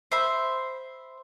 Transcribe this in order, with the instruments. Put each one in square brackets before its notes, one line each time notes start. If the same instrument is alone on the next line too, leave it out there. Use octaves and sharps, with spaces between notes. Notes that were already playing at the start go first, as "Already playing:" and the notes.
[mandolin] C5 E5 B5